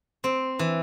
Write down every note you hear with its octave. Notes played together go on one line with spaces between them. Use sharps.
C4
E3